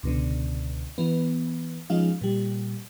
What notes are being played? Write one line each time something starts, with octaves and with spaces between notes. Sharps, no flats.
C#2 B2 D3
E3 B3
F3 G#3 C#4 D#4 F5
A#2 G3